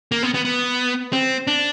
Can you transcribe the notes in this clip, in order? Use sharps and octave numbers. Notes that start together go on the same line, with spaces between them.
A#3
B3
B3
B3
C4
D4